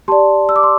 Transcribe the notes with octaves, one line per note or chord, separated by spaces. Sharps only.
G4 D5 A5 C6
E6
D6
C6